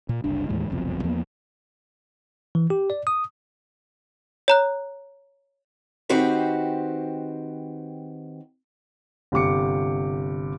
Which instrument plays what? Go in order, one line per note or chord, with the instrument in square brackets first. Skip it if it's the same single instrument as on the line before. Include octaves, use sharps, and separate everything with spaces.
[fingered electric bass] A#2
F#1 C2 D4
D#2 A2 E3 G#3
F#1 C2 F2 B2
E2 F3 A#3 B3
[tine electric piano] E3
G4
D5
D#6
[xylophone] C#5 A#5 F#6
[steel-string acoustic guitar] D#3 C4 F#4 G4 B4 C5
[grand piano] G1 C3 D6 C#7